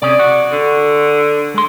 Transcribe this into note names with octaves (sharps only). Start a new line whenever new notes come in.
C3 C#4 G#4 D5
F#4
D3
G#3 C6